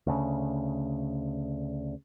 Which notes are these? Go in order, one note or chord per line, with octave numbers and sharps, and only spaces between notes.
D2 C#3